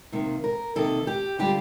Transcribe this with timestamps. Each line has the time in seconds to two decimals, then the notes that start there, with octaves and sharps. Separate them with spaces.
0.12 C3 D#3 A#3
0.44 A#4
0.76 C3 D#3 A#3 A4
1.07 G4
1.39 D3 G3 D4 F4 G4